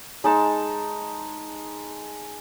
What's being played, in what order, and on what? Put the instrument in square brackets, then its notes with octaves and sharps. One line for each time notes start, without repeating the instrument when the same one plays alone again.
[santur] G#3 D#4 A5